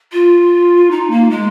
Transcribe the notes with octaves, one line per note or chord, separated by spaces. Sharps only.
F4
D#4
A#3
G#3